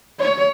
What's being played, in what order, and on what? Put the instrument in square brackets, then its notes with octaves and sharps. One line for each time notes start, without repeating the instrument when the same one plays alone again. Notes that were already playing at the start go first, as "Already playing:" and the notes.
[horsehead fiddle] C#5